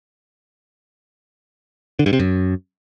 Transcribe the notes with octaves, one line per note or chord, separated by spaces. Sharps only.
D3
G2
C3
F#2